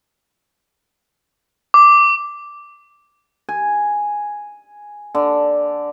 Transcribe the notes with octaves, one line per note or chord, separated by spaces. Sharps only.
D6
G#5
D3